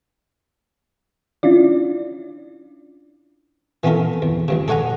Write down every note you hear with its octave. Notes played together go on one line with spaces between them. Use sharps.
C#4 D4 E4 F4 D5
E3 B3 C#4 F4 A4 A#4
E2
C#2 G2 C#3
A4 C#5 D5 F#5 G#5 A#5